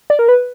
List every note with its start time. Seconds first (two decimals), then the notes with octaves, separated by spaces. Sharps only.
0.10 D5
0.19 A#4
0.29 B4